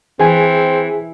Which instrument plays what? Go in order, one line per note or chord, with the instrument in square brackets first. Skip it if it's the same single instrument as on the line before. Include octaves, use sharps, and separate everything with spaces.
[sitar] E3 [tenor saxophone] C4 [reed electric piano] G#4 G#5